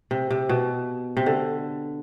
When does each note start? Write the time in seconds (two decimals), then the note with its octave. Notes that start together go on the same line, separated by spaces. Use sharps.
0.11 C3
0.31 C3
0.49 B2
1.17 C3
1.26 D3